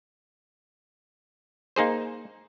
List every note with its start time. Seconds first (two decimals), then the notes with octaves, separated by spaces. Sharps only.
1.76 A#3 D#4 G#4 C5